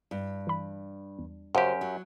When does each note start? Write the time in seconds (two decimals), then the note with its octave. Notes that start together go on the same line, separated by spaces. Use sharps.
0.11 G2
0.47 E3 B5
1.19 E2
1.55 F#2 C#3 F#4 G4 C5 F5 F#5 D6
1.81 F#3